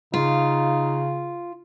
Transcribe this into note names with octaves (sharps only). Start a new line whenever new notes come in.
C#3 D#4 F4